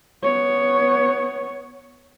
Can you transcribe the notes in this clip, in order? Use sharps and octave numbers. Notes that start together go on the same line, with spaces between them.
B3 C#5